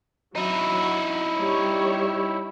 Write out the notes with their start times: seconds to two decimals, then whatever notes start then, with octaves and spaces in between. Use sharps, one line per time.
0.35 F#3 D#4 E4
1.39 G3 C#5